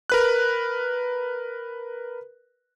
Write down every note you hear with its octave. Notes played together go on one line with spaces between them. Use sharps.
A#4 B4 F#6